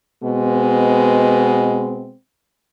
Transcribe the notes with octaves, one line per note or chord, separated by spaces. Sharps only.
B2 G#3 B3 C4